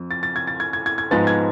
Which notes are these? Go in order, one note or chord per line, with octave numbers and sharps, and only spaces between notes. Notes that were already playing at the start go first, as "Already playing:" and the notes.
Already playing: F2
A6
A6
G#6
A6
G#6
G#6
G#6
G#6
G#2 F3 G#3 B3 A6
G#6